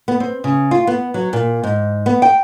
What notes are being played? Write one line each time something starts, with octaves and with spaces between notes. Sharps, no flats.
B3
C4
C#3
F4
B3
F#3
A#2
G#2
B3
G5